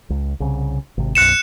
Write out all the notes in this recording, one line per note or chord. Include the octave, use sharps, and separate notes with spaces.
C#2
C2 C#3
G#1 C3
B1 F#2 F#6 C#7 E7